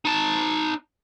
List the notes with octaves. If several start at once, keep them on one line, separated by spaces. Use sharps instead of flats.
D#4 A5